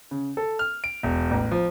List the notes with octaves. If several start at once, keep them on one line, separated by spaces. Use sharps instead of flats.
C#3
A4
F6
D7
E1
A1
F3